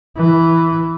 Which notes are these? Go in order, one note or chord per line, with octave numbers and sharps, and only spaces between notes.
E3